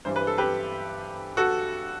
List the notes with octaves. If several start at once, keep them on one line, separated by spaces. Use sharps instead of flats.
G2 E3 G3 C5
B4
A4
G4 B4
F#4 A4